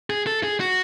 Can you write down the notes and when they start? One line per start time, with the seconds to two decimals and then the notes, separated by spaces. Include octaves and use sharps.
0.10 G#4
0.27 A4
0.43 G#4
0.60 F#4